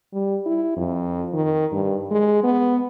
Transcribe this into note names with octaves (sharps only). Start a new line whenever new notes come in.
G3
E4
F2
D#3
G2
G#3
B3